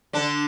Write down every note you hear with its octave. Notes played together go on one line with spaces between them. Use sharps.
D3 D4